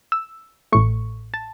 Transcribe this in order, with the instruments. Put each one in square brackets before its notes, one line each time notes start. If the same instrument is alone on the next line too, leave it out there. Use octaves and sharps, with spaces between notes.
[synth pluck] E6
A1 A2 A3 C#6
A5